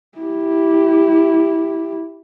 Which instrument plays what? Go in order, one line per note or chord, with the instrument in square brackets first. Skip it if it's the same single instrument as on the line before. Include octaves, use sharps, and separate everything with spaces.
[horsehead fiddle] E4 G4